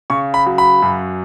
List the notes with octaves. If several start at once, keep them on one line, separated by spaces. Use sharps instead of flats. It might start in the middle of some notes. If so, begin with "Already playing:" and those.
C#3 C#6
B5
F#3
B5
F#2